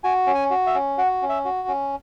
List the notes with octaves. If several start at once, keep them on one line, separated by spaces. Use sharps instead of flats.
F#4 G#5
C#4
G#5
F#4
E5
C#4
F#4 F#5
C#4
E5
F#4
C#4